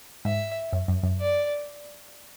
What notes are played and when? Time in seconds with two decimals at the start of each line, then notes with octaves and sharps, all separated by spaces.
0.25 G#2 E5
0.73 F#2
0.88 F#2
1.03 F#2
1.20 D5